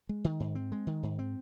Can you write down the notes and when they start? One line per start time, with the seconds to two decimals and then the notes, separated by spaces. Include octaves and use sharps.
0.09 G#3
0.24 D#3
0.40 G#2
0.55 C4
0.72 G#3
0.87 D#3
1.03 G#2
1.19 C4